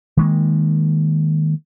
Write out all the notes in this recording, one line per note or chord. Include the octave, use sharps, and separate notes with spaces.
D#3 G#3 A#3